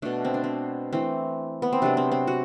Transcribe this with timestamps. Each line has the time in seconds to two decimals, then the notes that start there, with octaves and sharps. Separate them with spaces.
0.02 B2 A3 D4
0.25 C4
0.34 D4
0.44 C4
0.93 E3 A3 C4
1.62 B3
1.73 C4
1.82 C3 F#3 B3 D4
1.97 C4
2.11 C4
2.27 F#4